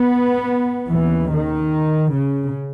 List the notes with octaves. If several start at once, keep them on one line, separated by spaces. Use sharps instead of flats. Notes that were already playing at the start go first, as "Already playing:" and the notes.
Already playing: B3
D#2 C#3 E3
D#3
C#3